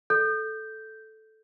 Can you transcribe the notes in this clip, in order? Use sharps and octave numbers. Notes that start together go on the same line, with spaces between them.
A4 G6